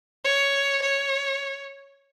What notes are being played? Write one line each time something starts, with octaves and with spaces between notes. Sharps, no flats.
C#5
C#5